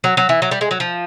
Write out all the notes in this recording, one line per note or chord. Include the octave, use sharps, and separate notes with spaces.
F#3
F#3
E3
F#3
G3
G#3
F#3
F3